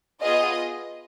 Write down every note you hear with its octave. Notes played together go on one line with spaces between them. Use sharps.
B3 F4 G#4 D#5